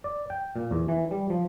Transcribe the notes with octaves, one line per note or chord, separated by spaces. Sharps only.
D5
G5
A#2
E2
E3
G3
F3